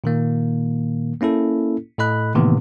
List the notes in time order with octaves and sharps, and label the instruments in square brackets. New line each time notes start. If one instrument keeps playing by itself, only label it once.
[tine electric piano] A#2 D#3 A#3
A#3 C#4 E4 A4
A2 A4 D#5 B5 F#6
A2 C3 D#3 E3 A#3 B3